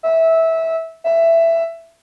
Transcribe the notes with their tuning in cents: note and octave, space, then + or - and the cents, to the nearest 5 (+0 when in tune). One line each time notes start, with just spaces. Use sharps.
E5 -15
E5 +10